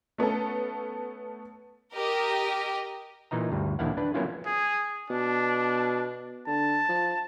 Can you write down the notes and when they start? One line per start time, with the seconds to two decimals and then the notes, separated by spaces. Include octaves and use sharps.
0.18 A3 B3 C#4 A4
1.94 G4 A#4 D#5
3.31 A#2 E3 D#4 D#5 A#5
3.52 D2 G2
3.79 A#1 D#2 D4 E4 F5 F#5
3.97 D4 B4
4.14 F#3 A#3 B3 C#4 E4 F4
4.46 G#4
5.10 B2 D4
6.47 D3 A5
6.88 F3